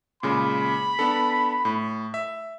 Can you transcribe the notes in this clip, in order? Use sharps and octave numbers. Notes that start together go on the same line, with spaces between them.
A#2 C#3 G#3 B5
B3 D4 A4
A2
E5